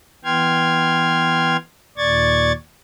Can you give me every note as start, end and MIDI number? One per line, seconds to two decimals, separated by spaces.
0.24 1.57 52
0.24 1.57 59
0.24 1.57 79
0.24 1.57 84
0.24 1.57 89
0.24 1.57 92
1.97 2.52 39
1.97 2.52 46
1.97 2.52 74
1.97 2.52 85
1.97 2.52 92
1.97 2.52 93